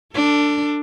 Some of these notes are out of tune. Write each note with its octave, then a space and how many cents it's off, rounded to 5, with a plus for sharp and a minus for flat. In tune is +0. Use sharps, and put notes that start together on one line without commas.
D4 +0 A4 +35